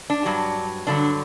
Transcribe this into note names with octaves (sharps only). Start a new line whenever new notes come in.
D4
G2 F#3
G2 D3 F#3 D4